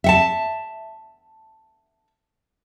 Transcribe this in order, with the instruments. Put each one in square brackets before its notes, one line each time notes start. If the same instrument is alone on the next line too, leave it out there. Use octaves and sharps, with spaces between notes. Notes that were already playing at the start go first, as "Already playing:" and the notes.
[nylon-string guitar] E5 F#5 A5